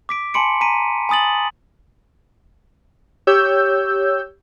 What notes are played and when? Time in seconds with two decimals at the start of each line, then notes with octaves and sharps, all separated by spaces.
0.09 D6 B6 D7
0.34 G#5 A5 B5 C6 C#7 D7
0.61 G#5 A#5 B6 D7 D#7
1.09 G#5 B5 D#6 A6 F#7
3.27 G4 C#5 E6 G6